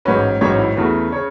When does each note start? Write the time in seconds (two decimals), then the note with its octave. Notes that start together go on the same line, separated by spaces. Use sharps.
0.05 A1 G#2 F#3 C#4 B4
0.41 A1 G#2 F#3 C#4 C#5
0.58 E4
0.76 E2 C#3 E3 A3 F#4
1.12 C#3 C#5